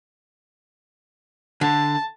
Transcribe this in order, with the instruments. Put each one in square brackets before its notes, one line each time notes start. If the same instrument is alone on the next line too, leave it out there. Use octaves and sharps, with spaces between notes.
[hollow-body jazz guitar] D3 [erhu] A5